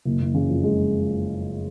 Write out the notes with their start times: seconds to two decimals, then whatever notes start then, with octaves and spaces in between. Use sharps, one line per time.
0.05 F#1
0.21 F#1
0.35 C#3
0.49 F2
0.63 G#3